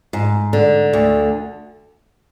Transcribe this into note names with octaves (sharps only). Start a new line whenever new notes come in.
G#2
D3
D2